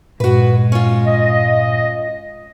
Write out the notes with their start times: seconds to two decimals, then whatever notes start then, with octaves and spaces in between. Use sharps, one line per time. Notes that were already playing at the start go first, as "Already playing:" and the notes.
0.20 G2 A#2 G#3 F#4 B4
0.72 C#4 F4
1.06 D#5